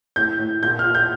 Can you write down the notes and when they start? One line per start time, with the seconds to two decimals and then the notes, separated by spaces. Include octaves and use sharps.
0.16 A2 G6
0.39 A2
0.63 A#2 G6
0.79 F6
0.86 A#2
0.95 G6